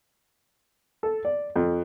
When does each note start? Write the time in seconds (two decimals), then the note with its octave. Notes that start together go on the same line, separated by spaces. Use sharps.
1.03 A4
1.25 D5
1.56 F2